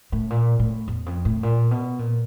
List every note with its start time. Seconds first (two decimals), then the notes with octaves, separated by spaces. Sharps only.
0.12 A2
0.30 A#2
0.59 A2
0.88 E2
1.06 F2
1.25 A2
1.43 A#2
1.71 B2
1.99 A#2